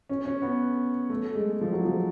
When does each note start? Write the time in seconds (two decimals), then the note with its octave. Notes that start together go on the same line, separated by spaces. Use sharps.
0.10 C#4
0.25 C#4
0.42 B3
1.10 A3
1.35 G#3
1.61 F3
1.73 F#3
1.85 F3